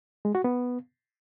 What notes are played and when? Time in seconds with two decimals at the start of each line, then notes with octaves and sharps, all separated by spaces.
0.25 G#3
0.35 F#4
0.44 B3